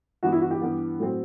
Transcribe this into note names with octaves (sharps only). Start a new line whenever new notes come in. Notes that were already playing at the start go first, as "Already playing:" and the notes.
G2 E3 B3 F#4
E4
F#4
G4
G2 E3 B3
A2 F#3 C4